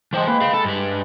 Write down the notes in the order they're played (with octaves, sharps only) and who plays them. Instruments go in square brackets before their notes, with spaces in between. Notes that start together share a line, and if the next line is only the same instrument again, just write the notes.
[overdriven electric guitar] E3 C5 [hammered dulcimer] G#3 G5 D6
[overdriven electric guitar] A#3 [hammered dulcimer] B4
[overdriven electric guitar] G#4 F5
[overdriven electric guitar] A4 [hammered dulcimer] B5
[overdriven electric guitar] G2 B4